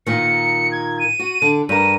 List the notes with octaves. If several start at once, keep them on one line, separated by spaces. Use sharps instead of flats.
A#2 D#3 C#7
G#6
D#7
F#4
D3
G2 A#4 D#7